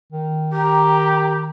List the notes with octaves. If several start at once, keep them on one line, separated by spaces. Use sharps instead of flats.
D#3
G4 A#5